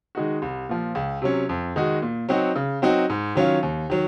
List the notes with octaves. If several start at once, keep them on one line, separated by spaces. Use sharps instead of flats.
D#3 G#3 D#4 F#4
C2
A#2 F3
C#2
C3 F#3 C#4
F2
D#3 G#3 D#4 F#4
A#2
F#3 C4 D#4 F#4
C#3
F#3 C4 D#4 F#4
G#2
D#3 F#3 C#4 F4
D#2
D#3 F#3